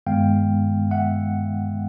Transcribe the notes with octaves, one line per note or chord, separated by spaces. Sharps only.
G2 D#3 G#3 B3 F5 G5
E5 F#5